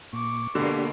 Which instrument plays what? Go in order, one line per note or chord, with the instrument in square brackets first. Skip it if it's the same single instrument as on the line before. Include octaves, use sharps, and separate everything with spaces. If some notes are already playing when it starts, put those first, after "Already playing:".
[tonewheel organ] A#2 [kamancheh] C#6 D6
[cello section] B2 A#3 [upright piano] D3 [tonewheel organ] D4 G4